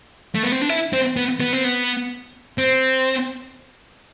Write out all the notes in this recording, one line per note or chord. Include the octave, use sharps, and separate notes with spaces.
A3
B3
C4
D4
E4
C4
B3
B3
C4
B3
C4